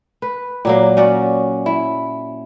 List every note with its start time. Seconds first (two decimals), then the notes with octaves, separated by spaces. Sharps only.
0.22 B4
0.65 A#2 F#3 A#3
0.97 C#4 F#4 D5
1.66 E4